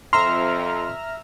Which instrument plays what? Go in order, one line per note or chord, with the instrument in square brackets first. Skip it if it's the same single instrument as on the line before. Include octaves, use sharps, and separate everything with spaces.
[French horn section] F2 [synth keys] E5 A#5 F6 [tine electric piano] C6